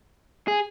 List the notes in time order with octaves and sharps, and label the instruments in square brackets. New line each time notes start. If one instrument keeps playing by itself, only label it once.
[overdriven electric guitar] G#4